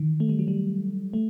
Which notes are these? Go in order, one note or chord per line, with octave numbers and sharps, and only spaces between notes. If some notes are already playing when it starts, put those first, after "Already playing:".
Already playing: D#3 E3
A3
G3
F#3
G3
A3